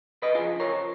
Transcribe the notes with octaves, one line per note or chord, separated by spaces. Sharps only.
C#3 B4 D#5
F3 F4 G#4
C#3 A#4 C#5
F3